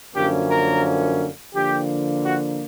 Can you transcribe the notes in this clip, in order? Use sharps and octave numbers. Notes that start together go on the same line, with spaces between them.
F#2 D3 F3 A#3 C#4 G4
A#4
D3 F3 A#3 G4
F#4